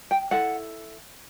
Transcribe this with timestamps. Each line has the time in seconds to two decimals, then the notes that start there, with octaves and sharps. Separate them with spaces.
0.11 G5
0.31 E4 A4 F#5